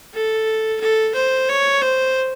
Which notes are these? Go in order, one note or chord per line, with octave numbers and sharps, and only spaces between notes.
A4
A4
C5
C#5
C5